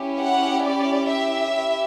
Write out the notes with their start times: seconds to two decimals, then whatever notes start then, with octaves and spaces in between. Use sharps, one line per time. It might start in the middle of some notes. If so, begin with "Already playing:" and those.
Already playing: C#4 E4 G4
0.19 F#5
0.64 D5
1.09 E5
1.54 E4 G4